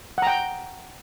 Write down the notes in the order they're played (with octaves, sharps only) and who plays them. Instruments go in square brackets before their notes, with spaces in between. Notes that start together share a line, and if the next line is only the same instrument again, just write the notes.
[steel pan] F#5
A#5
G5